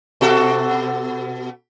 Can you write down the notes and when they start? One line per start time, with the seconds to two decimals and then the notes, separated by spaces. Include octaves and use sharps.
0.21 B2 F#4 A4